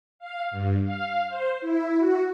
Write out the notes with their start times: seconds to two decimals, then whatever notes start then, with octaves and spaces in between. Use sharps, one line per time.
0.19 F5
0.51 G2
0.83 F5
1.29 C5
1.61 E4
1.98 F#4